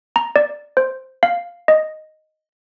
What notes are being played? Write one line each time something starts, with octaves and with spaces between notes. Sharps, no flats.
A#5
D5
C5
F5
D#5